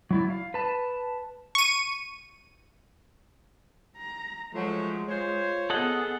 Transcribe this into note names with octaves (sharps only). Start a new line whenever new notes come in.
F#3 E4 D5
F5
B4 A5
C#6 D#7
A#5
F3 F#3 G#3 A3
F4 C5 C#5
B3 G#4 A4 D#5 F#5